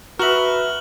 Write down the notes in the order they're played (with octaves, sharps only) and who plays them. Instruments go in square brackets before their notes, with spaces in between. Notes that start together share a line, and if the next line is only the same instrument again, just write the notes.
[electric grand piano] F#4 [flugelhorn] B4 [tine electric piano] E5 A#5 [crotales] F6 F#6 F#7